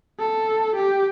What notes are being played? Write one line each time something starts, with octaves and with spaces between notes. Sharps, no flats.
A4
G4